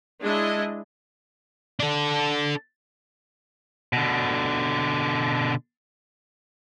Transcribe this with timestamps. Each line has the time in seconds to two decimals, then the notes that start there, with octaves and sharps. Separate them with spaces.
0.23 G#3 D4 E4 D#5
1.80 D4 A4
3.93 B2 D3